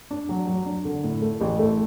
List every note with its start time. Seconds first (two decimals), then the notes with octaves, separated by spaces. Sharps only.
0.11 D4
0.29 F#3
0.47 F#3
0.66 D4
0.85 D3
1.04 A2
1.22 A3
1.41 A1
1.59 A3